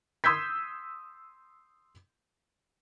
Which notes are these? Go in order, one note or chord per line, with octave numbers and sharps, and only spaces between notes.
C6 D#6 E6 G6 G#6 B6